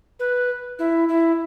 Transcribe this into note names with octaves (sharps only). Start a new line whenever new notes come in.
B4
E4
E4